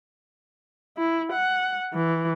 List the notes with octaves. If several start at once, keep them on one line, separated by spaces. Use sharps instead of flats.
E4
F#5
E3